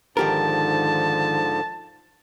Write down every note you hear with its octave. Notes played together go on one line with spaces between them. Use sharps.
G#2 D3 D#3 F3 G4 A#4 A5